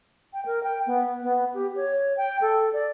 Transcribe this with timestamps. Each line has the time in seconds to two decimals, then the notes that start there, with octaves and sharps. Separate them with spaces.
0.33 G5
0.46 A#4
0.63 G5
0.86 B3
1.22 B3
1.54 G4
1.76 C#5
2.17 G5
2.41 A4
2.73 D5